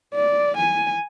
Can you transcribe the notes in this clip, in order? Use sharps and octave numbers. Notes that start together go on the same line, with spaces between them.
D5
G#5